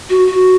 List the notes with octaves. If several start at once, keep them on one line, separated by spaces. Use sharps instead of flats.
F#4
F#4